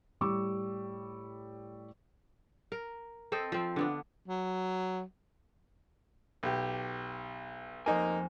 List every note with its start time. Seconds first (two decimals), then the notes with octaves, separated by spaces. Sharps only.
0.21 A2 G3 C#6 D6 E6
2.72 A#4
3.32 C4 A4 C5 D#5
3.52 F3 C4
3.76 D3 B3 D4
4.28 F#3
6.43 B1 G4
7.86 F2 A#3 D#4 C5 G#5